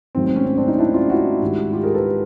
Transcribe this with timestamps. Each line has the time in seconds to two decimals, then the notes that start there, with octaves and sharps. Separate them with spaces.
0.15 G#2 D#3 F#3 A3 C4
0.26 C4
0.36 C#4
0.47 C#4
0.57 C4 D4
0.68 C#4 D#4
0.78 D4 E4
0.94 D#4 F4
1.10 E4 F#4
1.42 G#2 D#3 G3
1.73 F4 G4
1.83 G#4 A#4
1.94 A4 B4